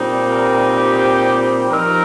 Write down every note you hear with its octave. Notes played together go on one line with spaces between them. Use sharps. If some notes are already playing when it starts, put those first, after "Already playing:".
Already playing: A#2 G3 C4 D#4
A#4
G4
F3 C4 D#4 A#4